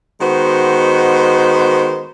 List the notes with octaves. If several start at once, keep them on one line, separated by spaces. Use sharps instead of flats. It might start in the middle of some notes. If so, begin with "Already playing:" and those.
D#3 G#3 B3 F#4 C5